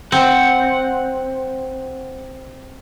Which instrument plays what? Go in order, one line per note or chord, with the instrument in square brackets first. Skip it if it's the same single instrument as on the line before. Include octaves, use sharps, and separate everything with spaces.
[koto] C4 [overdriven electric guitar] F#5